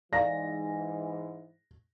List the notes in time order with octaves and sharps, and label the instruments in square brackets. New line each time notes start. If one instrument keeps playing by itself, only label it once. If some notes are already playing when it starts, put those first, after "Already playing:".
[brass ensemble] G#2 E3 [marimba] D5 F5 A#5 [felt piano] A#6